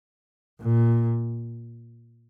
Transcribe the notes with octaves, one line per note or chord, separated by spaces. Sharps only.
A#2